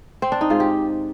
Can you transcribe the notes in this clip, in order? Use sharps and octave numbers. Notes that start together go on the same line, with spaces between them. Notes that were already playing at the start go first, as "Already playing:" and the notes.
C4
D4
D#4
G#2 F4
G4